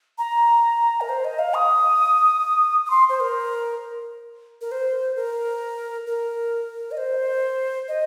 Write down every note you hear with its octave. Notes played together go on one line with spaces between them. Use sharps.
A#5
A#4
C5
D#5
F5
D#6
D#6
C6
C5
A#4
A#4
C5
A#4
A#4
D#5
C5
D#5